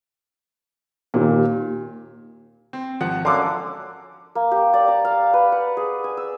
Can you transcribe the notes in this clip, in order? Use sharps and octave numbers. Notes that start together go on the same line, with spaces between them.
D#2 A#2
C4
G#1 F3 F#5
F#2 D3 F5 D6
A#3
G4
D5
A#5
F5
B4
F#5
G#4
G#5
E6